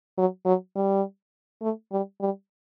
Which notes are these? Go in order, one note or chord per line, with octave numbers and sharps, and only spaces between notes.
F#3
F#3
G3
A3
G3
G3